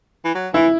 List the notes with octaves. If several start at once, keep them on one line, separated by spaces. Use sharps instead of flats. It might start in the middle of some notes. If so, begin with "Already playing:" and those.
E3
F#3
E3 E4